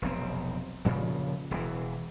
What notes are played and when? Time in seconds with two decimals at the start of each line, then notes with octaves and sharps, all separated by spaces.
0.02 F1 B1 C4
0.85 A#2 C#3 F3
1.51 E1 E3